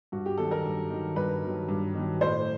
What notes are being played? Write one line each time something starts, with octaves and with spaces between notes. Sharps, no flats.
G2 F#4
G4
D#3 F#3 A4
A#4
G2
D#3
F#3
G2 B4
D#3 F#3
G2
D#3 F#3
A2 C5